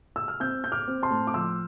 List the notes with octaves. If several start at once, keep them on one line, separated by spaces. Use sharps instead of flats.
E6
F6
C4 E6 G6
C4 G6
D6 F6
C4
A5 C6
A2
D6
F3 C6 E6